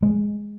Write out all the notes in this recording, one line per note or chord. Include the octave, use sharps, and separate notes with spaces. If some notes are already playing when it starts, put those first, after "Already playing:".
G#3